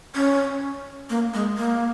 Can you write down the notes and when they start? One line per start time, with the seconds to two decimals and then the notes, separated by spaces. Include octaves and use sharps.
0.15 C#4
1.10 A#3
1.34 G#3
1.58 A#3